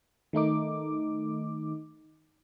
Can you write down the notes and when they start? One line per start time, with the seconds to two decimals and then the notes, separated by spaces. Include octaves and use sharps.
0.33 D#3 A3 D#4 D6